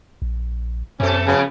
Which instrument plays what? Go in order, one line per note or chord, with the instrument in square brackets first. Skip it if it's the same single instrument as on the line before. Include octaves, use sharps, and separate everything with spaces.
[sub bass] A#1
[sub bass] F#2 [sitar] B2 A4 [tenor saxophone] C#4
[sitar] F2 B3 [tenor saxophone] C#3